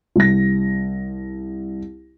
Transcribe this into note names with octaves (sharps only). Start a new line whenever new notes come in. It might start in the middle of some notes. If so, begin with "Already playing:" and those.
C2 A#6